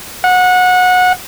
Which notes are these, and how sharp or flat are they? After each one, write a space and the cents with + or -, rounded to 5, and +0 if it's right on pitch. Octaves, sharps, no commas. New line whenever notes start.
F#5 -20